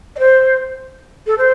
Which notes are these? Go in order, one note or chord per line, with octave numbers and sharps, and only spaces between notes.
D5
C5
A4
C5